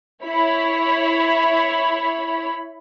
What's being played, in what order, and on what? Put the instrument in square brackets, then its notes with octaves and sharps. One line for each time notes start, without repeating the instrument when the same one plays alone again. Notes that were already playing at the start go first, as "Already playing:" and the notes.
[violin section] E4 C#5 B5